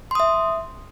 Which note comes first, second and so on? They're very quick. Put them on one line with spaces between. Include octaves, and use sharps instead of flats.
C6 D#6 E5